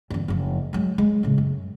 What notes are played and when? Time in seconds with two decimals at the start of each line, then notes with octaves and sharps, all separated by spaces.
0.10 G1 E2
0.28 F#1 F3
0.73 F#3 G#3
0.98 G#3
1.23 A2 C#3
1.38 F#2